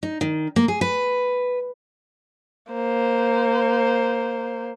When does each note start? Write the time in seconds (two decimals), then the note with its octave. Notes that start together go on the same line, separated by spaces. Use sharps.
0.03 D#4
0.21 D#3
0.56 A#3
0.68 G#4
0.81 B4
2.72 A#3 C5